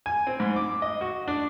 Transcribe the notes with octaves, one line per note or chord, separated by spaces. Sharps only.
G#5
C4
G#2
D6
D#5
F#4
D4